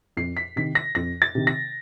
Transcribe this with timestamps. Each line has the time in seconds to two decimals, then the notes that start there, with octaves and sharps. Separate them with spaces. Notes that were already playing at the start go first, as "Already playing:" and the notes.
0.17 F2 C7
0.37 B6
0.56 C3 D#3 B6
0.75 A#6
0.95 F2 A#6
1.22 A6
1.35 C3 D#3
1.47 A#6